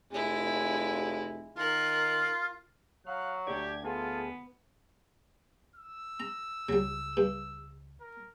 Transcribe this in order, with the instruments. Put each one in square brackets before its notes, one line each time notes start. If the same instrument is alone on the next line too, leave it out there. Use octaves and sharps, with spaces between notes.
[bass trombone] F1 [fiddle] G#3 E4
[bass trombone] D#3 [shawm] F4 [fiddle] A#4 F#6
[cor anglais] F#3 [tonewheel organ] F5 [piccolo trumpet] F#6
[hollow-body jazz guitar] D2 D5 [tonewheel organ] D4 G#6 [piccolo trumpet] G4
[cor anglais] B3 [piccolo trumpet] F4 [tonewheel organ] G#4 A4
[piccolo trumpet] E6
[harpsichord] A#5
[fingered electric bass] C#2 [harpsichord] F#3 G3
[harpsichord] G2
[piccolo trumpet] A#4